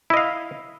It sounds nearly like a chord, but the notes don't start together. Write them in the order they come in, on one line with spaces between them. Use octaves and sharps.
E4 D#5 F5